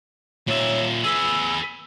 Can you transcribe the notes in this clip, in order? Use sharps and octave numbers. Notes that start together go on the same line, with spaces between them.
A#2 C#5 E5
G#4 B4 E6